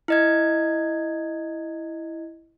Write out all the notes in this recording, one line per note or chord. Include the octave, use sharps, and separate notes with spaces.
E4 D#5 G#6